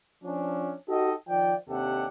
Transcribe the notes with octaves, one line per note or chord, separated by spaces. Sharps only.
F3 C#4 D4
D#4 F#4 G4 A4 D#5
D#3 F3 D5 G5
D#2 C3 D4 G4 A4 F#5